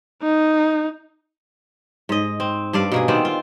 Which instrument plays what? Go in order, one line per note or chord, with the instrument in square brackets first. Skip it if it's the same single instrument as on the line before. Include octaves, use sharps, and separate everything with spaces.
[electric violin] D#4
[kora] G#2 D#5
C4
G2 D4 D5 F5
B2 A#3 G#4
D#3 B3 C4 D5
F4